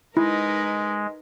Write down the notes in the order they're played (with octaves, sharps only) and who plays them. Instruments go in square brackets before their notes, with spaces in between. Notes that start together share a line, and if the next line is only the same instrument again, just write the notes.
[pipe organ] G#3 [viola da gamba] D#4 A#4 B4 [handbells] E4